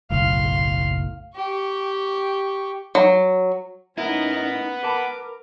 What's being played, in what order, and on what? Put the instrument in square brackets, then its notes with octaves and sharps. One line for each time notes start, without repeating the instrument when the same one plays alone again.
[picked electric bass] F#1 B1 A2 [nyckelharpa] F5 C6
[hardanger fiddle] G4 C#6
[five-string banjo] F#3
[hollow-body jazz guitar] A2 E4 [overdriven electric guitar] B3 [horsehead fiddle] C#4 D#4 [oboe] A#4
[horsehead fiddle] A#4 [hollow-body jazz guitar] B4 A5 B5 [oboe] D6